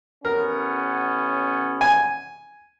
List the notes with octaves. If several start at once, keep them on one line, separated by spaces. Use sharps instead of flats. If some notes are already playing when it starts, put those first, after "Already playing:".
A1 B3 C#4 A#4
G#5